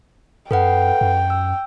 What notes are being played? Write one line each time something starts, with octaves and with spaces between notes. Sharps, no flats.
F#2 A4 B4 F#5 G5
F#2
E6